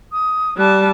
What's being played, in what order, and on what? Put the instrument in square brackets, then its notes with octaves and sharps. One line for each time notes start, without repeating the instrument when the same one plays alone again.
[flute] D#6
[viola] G3 A5 [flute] F#6